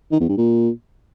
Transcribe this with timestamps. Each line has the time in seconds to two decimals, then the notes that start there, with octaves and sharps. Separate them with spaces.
0.12 D#3
0.20 E2
0.29 G2
0.37 A#2